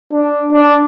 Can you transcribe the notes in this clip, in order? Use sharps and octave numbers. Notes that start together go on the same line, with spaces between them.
D4
D4